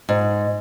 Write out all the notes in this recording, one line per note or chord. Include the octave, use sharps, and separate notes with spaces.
G#2